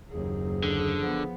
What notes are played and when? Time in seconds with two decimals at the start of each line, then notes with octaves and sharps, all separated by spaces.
0.10 F#1 D#2 G#4
0.63 D3
0.99 F3 B3